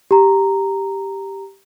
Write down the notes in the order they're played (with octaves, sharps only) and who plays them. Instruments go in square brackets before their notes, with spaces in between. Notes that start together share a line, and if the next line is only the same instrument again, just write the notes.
[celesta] G4 A#5